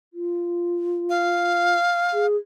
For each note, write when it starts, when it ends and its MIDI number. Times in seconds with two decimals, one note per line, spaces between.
0.13 1.75 65
1.09 2.26 77
2.13 2.36 68